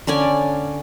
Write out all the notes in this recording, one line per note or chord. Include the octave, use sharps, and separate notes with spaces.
D3 C#4 D5 G#5